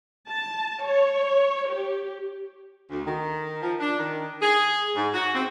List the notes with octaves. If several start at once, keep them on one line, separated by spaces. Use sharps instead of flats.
A5
C#5
G4
D2
D#3
F3
D4
D#3
G#4
G#2
F#4
C4